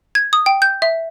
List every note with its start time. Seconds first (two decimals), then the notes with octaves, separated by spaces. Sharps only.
0.15 G#6
0.33 D#6
0.46 G5
0.62 G6
0.82 E5